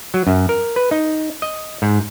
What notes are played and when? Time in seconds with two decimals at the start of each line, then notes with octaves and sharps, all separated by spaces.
0.14 F#3
0.27 F#2
0.49 A#4
0.76 B4
0.91 D#4
1.42 D#5
1.82 G#2